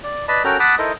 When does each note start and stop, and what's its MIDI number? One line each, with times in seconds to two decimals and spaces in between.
0.04 0.25 74
0.28 0.42 71
0.28 0.42 74
0.28 0.42 75
0.28 0.42 81
0.28 0.42 83
0.44 0.57 61
0.44 0.57 66
0.44 0.57 69
0.44 0.57 70
0.44 0.57 79
0.44 0.57 82
0.60 0.75 78
0.60 0.75 81
0.60 0.75 83
0.60 0.75 86
0.60 0.75 87
0.79 0.92 63
0.79 0.92 64
0.79 0.92 69
0.79 0.92 70
0.79 0.92 72
0.79 0.92 75